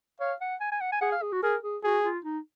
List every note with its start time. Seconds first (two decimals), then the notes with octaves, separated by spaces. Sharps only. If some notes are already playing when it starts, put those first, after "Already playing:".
0.20 C#5 F5
0.41 F#5
0.60 G#5
0.72 G#5
0.81 F#5
0.92 G#5
1.01 G#4 F#5
1.12 F5
1.22 G#4
1.32 F#4
1.43 G#4 A#4
1.63 G#4
1.84 F#4 G#4
2.04 F4
2.24 D#4